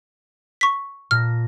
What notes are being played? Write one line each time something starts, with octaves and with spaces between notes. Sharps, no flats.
C#6 B6
A#2 A5 F6 A#6